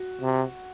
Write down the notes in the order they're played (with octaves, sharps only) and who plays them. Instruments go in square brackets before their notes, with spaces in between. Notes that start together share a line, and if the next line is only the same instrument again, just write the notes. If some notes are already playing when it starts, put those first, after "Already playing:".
Already playing: [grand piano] F#4
[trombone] C3